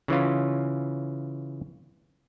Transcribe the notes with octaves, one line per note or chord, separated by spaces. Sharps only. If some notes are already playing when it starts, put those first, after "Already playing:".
C#3 E3 C#4 F4